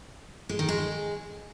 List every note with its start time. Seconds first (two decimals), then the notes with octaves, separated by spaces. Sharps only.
0.49 G#3
0.59 D#3
0.69 G#3